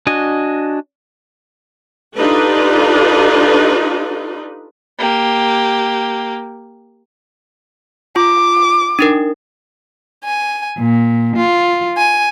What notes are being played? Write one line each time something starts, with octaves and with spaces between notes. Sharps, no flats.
D4 F#4 D#5 G#5
D4 D#4 F4 G4 A4 B4
A#3 G4
F4 D6
D4 D#4 A#4
G#5
A#2
F4
G#5